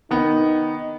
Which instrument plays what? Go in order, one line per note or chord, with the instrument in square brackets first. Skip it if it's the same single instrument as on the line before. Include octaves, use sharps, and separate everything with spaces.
[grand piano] D#3 B3 [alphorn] D#4